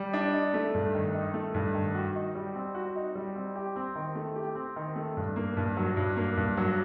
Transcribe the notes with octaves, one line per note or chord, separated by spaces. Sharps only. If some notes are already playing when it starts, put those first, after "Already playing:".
Already playing: G3
D4
D#4
A3
G2
D#3
D#4
A3
G2
D#3
F#4
D#4
G3
C4
F#4
D#4
G3
C4
G4
C4
D#3
A3
G4
C4
D#3
A3
G2
A#3
G2
F#3
G2
A#3
G2
F#3